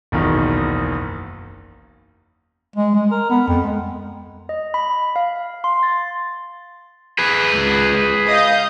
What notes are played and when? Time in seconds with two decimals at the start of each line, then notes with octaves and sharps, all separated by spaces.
0.12 F#1 B1 E2 D#3
2.76 G#3
2.95 G#3
3.11 A#4
3.30 B3
3.48 F2
3.64 G#3
4.49 D#5
4.74 B5
5.16 F5
5.64 C6
5.83 A6
7.18 G#4 B4
7.54 C#2
8.29 D#5 F5 G6